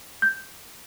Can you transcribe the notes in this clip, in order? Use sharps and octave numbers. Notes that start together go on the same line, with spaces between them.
G6